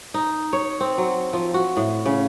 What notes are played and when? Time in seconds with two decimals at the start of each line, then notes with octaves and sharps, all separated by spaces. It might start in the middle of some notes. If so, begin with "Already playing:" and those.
0.14 D#4
0.53 C#5
0.80 C4
0.98 F#3
1.33 F3
1.54 F#4
1.77 A2
2.06 C#3